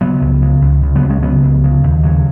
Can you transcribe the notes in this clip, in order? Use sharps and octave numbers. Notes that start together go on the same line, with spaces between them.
C#3 F#3 B3
C#2
C#3
C#2
C#3
F#3 B3
C#2
G#3 C#4
C#3 F#3 B3
C#2
C#3
D#2
C#3 F#3